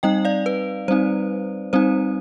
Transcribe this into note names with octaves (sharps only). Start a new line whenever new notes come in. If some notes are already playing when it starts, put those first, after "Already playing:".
G3 C4 D#4 D#5 G5
D5 F5
B4
G3 C4 D#4 C5
G3 C4 D#4 C5